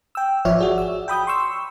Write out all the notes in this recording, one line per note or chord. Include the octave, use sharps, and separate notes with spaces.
G5 E6
G#1 F3 C#5 D5 E5 F6
F#4 G#4 D5
E6
G5 B5 D#6 G6
C6 C#6 E6